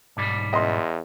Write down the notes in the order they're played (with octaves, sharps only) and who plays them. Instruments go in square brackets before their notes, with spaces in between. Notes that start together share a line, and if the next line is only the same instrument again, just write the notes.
[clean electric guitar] B1 G#2 G3
[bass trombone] E2 [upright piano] D#5 C6